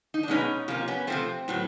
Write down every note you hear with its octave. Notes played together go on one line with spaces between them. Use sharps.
D#4
D4
B2 G#3 B3 C#4 D#4
C3 F3 A#3 C#4
B3 C#4
C3 F3 A3 C4
A2 F#3 B3